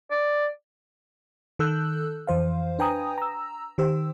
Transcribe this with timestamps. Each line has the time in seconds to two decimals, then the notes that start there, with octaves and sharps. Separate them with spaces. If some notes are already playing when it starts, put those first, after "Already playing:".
0.11 D5
1.59 D#3 A4 E6 F#6 G6
2.27 F2 E3 C5 F5
2.79 D4 B4 G5 G#5 A#5 D#6
3.18 A#5 E6
3.78 D#3 G4 C5 E6